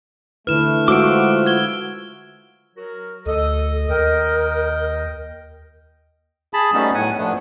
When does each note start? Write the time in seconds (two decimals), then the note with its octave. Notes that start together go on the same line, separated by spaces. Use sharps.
0.47 D3 A3 E4 B4 F6 E7
0.88 G#3 F4 F#4 C5 D6 E6 D7
1.46 G#6 G7
2.76 F#3 F#4 A#4
3.26 D2 A4 D#5
3.88 D#2 A#4 D#5 G5
6.54 G#4 A5 B5
6.74 F#3 G3 A3 B3 C#4 D#4
6.94 A2 F#5 G#5
7.18 G2 F3 A3 B3 D4